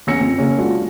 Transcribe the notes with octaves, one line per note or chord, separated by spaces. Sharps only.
E2 C#4 E6 A#6 C#7
F2
C#3 A#3 C#4
F#3 G#3 D4 F4 F#4